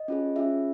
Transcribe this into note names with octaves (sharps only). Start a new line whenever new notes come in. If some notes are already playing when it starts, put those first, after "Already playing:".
Already playing: D#5
C#4 F4 G#4
C#4 F4 G#4 E5